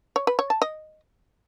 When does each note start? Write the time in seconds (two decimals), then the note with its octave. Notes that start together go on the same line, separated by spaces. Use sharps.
0.16 C#5
0.27 B4
0.39 C#5
0.50 A5
0.62 D#5